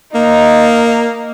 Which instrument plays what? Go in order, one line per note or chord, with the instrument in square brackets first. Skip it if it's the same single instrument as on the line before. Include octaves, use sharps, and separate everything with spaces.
[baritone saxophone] A#3 [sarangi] D#4